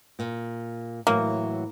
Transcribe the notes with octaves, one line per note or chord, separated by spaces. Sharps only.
A#2
A2 E3 F#3 A#3